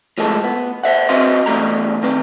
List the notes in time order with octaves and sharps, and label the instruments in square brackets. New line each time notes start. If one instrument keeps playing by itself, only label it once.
[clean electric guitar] A2 F3 G#3 A#3 A4
B3
C5 E5 F#5
C4 F#4 B4 D#5 F5 C6
E2 G#2 G3 A3 A#5
D#3 C4 B4